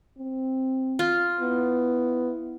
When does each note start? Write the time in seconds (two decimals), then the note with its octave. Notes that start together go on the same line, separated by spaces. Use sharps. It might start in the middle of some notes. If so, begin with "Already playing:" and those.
0.18 C4
0.99 F4
1.40 B3 E4